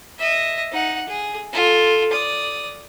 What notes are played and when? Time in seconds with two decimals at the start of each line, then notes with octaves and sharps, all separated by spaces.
0.18 D#5 E5
0.71 D#4 F#5
1.08 G#4
1.53 F4 A4
2.12 D5 D#6